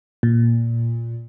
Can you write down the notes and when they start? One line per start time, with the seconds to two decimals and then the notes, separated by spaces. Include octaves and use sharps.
0.23 A#2